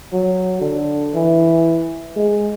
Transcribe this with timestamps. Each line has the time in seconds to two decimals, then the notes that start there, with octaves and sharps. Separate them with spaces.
0.13 F#3
0.61 D3
1.14 E3
2.16 G#3